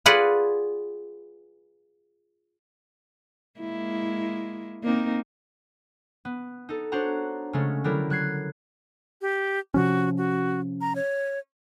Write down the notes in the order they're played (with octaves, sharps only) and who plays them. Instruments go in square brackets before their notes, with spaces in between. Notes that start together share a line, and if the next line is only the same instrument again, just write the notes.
[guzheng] F4 G#4 B4 D5 F#5
[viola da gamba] G#3 A#3 E4
A#3 C4 D#4
[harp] B3
D#4 A4
D4 F#4 C5 C#5 F#5 A#5
C#3 G#3 A3 C#4
D3 F#3 G3 E4 A#4
F#3 F#6 G#6 C7
[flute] G4
[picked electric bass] C3 F3 C#4 [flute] F#4
[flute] F#4
A#5
C#5